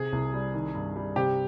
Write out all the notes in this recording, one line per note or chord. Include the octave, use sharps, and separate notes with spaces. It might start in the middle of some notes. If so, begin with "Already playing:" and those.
Already playing: C3 G#4
C2
G3
D#3
G2
G3
C3 G4